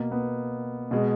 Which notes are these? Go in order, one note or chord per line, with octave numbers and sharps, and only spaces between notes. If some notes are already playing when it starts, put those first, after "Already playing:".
Already playing: B2 A#3
B3
B2 G#3